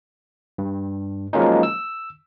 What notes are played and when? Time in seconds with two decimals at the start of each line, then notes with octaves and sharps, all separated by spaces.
0.58 G2
1.33 F3 F#3 G#3 A#3 C#4 D#4
1.63 E6